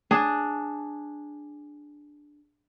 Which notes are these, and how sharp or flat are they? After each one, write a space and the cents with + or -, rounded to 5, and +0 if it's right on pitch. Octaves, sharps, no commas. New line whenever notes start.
D4 +5 G#4 +0